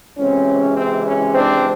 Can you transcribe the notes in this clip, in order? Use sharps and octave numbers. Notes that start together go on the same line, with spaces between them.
C#2 C3 E3 G#3 C4 C#4
C4
C#4
C4 D4